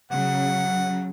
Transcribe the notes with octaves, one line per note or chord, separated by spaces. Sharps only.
C#3 F#3 F#5